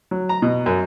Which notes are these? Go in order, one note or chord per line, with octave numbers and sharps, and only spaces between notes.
F#3
A#5
B2
F#2